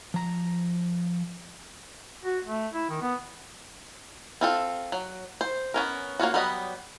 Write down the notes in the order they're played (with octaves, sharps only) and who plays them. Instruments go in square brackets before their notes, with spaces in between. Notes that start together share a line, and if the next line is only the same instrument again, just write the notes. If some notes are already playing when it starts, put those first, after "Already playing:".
[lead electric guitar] F3 A#5
[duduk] F#4
A3
E4
D#3
B3
[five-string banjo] C4 F4 A4
F#3
C5
B3 C#4 A#4
A#3 C#4 F4 F#4
F#3 G3 B3 D#5